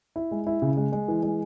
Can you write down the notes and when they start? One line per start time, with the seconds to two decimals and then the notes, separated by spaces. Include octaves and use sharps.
0.16 E4
0.31 G#3
0.47 E4
0.62 C#3
0.77 G#3
0.92 G#3
1.08 E3
1.23 G#3